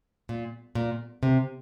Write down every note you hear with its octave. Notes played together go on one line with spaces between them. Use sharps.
A#2
A#2
C3